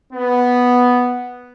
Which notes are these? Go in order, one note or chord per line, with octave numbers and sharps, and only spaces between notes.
B3